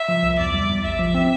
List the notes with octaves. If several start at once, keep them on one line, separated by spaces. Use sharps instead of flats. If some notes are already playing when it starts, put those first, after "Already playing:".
Already playing: E5
F3
C2
E2 D5
G3
E2
A1 E5
F3
C4